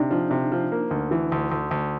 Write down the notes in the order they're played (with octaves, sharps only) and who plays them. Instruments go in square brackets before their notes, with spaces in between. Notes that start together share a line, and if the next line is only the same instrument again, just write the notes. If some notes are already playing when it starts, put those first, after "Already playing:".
Already playing: [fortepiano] C3 [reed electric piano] D4 D#4
[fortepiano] F3
C3
F3
A#3
D2
E3
D2
D2
D2